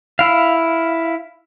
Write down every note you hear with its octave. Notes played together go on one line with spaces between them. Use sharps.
E4 F5